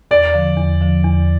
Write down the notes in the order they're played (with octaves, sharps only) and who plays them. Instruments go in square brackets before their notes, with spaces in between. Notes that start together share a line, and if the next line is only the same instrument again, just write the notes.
[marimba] E2 [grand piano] D5
[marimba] D3 F3
E2
D3 F3
E2